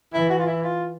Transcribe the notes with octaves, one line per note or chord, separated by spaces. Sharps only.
E3 E4
F#4
F4
E4
F4